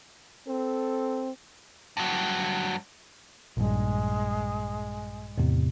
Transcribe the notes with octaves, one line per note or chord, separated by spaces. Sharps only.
C4 A4
G2 F#3
A#1 G2 G#3
E2 A2 C3